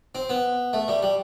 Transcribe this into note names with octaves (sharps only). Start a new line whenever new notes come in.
C4
B3
A3
G3
G3